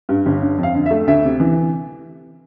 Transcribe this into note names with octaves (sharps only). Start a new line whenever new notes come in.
G2
G1
D3
F2
F5
D3
E5
A3
D2 E5
C3
E3